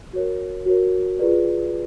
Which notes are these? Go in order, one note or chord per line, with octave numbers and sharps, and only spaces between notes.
F#4 A#4 C#5
F#4 A#4 C#5
F4 G#4 B4 D5